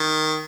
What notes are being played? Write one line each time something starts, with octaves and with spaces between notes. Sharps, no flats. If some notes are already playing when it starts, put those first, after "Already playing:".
Already playing: D#3